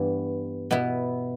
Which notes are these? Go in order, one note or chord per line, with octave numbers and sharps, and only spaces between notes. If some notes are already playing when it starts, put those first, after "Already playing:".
Already playing: G2 E3 B3
B2 B3 E4